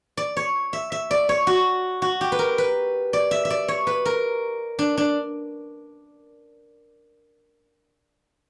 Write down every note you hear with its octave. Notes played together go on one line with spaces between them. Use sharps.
D5
C#5
E5
E5
D5
C#5
F#4
F#4
G4
B4
A#4
B4
D5
E5
E5
D5
C#5
B4
A#4
D4
D4